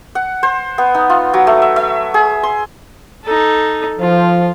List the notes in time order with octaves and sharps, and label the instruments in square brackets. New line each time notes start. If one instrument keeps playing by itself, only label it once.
[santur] F#5
C5
B3
D#4
F4
F#3
A3
E5
E5
G#4
C6
[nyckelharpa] D#4 A4
[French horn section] F3 [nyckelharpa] F4